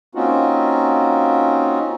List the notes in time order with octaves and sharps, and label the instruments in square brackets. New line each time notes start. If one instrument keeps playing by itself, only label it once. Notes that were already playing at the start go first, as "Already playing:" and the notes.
[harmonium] A#3 C4 C#4 D#4 F4 F#4